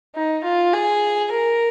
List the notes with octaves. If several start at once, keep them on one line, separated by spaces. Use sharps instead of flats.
D#4
F4
G#4
A#4